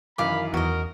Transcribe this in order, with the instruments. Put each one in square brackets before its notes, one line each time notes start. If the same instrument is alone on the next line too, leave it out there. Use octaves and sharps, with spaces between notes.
[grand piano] F#2 D#3 E3 [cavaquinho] F5 D6 [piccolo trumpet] B5
[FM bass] E2 [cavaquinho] F#4 D#5 [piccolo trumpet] A#4